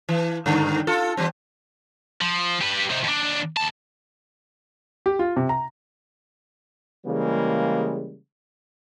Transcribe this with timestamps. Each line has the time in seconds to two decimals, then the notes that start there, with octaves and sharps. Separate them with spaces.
0.09 E3
0.46 G2 D3 D#3
0.87 F4 A4
1.17 E3 G3 C4
2.21 F3
2.61 G4 B4
2.90 C3 D#4
3.04 D#2 D4
3.57 D#2 A5
5.06 G4
5.19 F4
5.36 C3
5.49 A#5
7.06 C#3 E3 G3 G#3 A#3